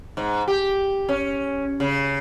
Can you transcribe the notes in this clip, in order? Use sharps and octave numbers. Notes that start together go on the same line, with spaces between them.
G#2
G4
C#4
C#3